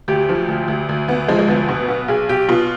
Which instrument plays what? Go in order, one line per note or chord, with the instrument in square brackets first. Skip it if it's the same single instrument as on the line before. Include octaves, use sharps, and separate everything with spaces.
[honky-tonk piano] D2 G4
F3
D2
D2
D2
D2 B3
F3 G#3
G#3
D2 B3
B2 B3
B1 B3
B1 G#4
B1 G4
B2 F4